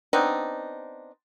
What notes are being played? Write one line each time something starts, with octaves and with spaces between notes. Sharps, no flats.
B3 C4 D4 D#4